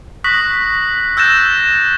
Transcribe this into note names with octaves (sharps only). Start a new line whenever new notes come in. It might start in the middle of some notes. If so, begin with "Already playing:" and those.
C#6 D#6 F#6 A#6 B6 F#7
E6 F#6 G6 A6 A#6 E7